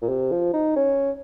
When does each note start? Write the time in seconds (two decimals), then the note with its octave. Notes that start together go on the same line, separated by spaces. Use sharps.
0.02 A#2
0.09 C3
0.32 F3
0.53 D#4
0.76 C#4